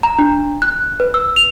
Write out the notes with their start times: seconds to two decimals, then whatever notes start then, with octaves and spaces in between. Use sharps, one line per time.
0.03 A#5
0.19 D4
0.62 F#6
1.00 B4
1.14 E6
1.36 F7